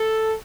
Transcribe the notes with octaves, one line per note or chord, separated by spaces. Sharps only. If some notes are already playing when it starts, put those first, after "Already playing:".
Already playing: A4